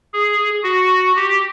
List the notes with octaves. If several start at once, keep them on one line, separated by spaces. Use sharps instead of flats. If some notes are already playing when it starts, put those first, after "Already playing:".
G#4
F#4
G4